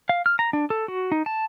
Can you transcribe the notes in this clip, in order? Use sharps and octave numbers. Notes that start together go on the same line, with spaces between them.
F5
F6
A#5
D4
A4
F#4
D#4
A5